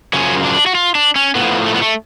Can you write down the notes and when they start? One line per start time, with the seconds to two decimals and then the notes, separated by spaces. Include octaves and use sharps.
0.13 F#2 C#3 F3 C#4
0.44 D4
0.66 F#4
0.75 F4
0.95 D4
1.16 C#4
1.35 A2 B3
1.40 F3
1.66 A3
1.74 B3
1.82 A3